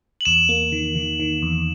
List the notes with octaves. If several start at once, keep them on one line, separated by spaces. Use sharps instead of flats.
F#7
E2 E7
A#3
D#3
D#3
D#3
E2